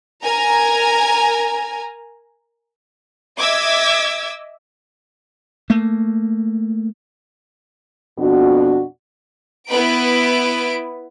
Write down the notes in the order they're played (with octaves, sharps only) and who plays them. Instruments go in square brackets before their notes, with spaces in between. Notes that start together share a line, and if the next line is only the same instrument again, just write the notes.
[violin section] A#4 G#5 A#5
D#5 E5 D6 E6 G#6
[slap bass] A3 A#3
[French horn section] F2 B2 D4 F#4
[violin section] B3 E4 B4 D7